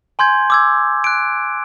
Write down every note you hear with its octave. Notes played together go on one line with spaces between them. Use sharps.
G#5 C6 G6 G#6
D6 E6 G#6
F#6 D7